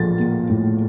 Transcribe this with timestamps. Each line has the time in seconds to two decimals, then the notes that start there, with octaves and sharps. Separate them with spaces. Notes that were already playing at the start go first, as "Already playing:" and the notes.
Already playing: A#1 A2 F3 A6
0.19 A#3
0.50 A2